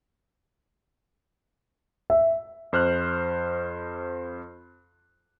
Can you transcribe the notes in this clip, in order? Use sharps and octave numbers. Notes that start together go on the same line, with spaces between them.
E5
F2 C5 F6 F#6